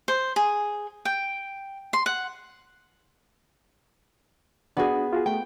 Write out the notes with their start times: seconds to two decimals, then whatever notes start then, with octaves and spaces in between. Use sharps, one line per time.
0.08 C5
0.36 G#4
1.05 G5
1.93 C6
2.06 F#5
4.77 B3 D4 F#4 G#4
5.13 F4 F#4 G#4
5.26 A3 G5